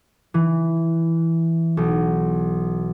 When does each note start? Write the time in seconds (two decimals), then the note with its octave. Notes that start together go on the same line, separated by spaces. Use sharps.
0.34 E3
1.77 B1